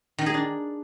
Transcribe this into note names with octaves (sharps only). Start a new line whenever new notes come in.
D#3
G#4
D4